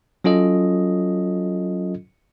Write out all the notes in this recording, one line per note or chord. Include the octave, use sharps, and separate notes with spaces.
F#3 C#4 F4 A4 D#5